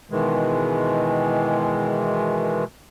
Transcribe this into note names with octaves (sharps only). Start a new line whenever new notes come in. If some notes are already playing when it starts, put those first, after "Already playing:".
B2 D#3 E3 G#3